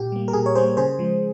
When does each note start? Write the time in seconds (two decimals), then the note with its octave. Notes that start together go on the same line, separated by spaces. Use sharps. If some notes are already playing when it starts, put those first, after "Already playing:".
Already playing: A#2 G4
0.12 G3 A#3
0.28 A#4
0.33 A#2 G#4
0.46 C#5
0.55 G3 A#3 G#4 C5
0.77 C#3 G#4 C5
0.99 F3 G#3